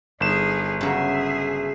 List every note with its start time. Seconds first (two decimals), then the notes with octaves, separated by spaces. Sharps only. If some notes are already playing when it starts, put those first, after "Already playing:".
0.20 G1 D#4 G#4 E7
0.81 C#3 F#3 G#4 E5